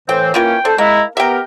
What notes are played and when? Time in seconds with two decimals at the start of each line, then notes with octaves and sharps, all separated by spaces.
0.09 A2 E3 C4 C5 G5
0.34 E3 A#3 C#4 F4 A#4 G5
0.65 D4 A4 C5
0.78 G#3 A#3 E4 A#5
1.17 B3 G4 A#4 E5 G5